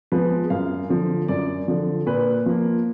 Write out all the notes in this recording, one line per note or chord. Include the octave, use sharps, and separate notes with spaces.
F3 G#3 B3 B4
F#2 F5
D3 F3
F#2 D5
D3 F3
A#2 B4
F3 A#3